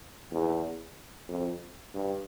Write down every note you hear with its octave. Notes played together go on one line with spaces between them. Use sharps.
E2
F2
G2